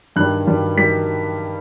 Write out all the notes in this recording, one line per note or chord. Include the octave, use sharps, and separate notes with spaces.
G2 D#3 G3 F#6
G2 D#3 G3
D#3 G3 B6